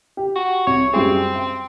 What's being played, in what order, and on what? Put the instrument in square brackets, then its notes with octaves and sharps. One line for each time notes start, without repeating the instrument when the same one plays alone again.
[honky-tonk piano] G4
[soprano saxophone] F#4
[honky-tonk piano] C2 [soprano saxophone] C#5
[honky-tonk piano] F#2 G3 G#4 [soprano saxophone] C4
[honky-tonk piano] G5